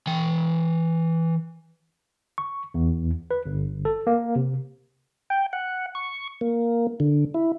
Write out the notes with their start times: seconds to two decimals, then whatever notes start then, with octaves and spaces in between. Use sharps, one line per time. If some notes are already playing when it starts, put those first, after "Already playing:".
0.07 E3 G5
2.38 C#6
2.74 E2
3.31 B4
3.46 G1
3.85 A4
4.07 A#3
4.36 C3
5.30 G5
5.53 F#5
5.95 C#6
6.41 A#3
7.00 D3
7.34 E4